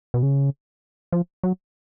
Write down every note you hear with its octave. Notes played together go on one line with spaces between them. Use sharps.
B2
C#3
F3
F#3